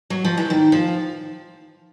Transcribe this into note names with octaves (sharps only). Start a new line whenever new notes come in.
F#3
F3
E3
D#3
F3